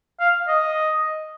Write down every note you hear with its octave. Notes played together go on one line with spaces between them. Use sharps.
F5
D#5